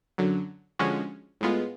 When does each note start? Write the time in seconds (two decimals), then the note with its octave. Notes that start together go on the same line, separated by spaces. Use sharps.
0.18 F#2 D3 F#3
0.79 D3 F3 G#3 C#4 F#4
1.41 A2 G#3 B3 F4